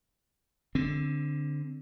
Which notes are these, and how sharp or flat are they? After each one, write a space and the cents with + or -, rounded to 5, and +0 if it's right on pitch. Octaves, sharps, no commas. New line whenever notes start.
D3 +0 C4 +0